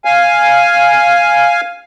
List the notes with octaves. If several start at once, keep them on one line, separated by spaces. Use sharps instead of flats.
F5 G#5